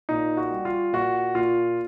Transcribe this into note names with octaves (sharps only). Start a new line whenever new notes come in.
A#2 D#4
F#4
G3
F4
A#2 F#4
A#2 F4